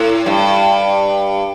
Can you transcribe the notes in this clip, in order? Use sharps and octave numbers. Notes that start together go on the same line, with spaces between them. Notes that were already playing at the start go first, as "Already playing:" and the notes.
Already playing: A2
G2